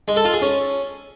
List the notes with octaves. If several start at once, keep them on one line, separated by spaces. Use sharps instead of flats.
G#3
A4
F4
G#4
C#4